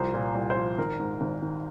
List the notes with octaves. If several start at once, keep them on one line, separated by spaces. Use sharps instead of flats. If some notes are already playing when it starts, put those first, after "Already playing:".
Already playing: C2 F3 C5
A#2
C2
C5
F3
G#1 A#4
G#2
G#1
D#3